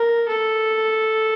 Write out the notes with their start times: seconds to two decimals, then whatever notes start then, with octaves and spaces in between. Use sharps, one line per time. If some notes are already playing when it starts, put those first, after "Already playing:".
Already playing: A#4
0.28 A4